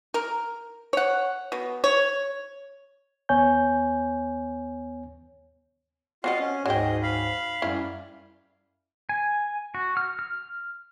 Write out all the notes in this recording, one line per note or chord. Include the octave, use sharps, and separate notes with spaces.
A#4
C#5 F#5
B2
C#5
D#2 B3 C#5 G#5 G6
C4 F4 F#4 D#5 F5
C#4
D2 G#2 F#3 G#4 D#5 G5
F5 B5
F#2 G3 E4 F5
G#5
F#4
F6
F6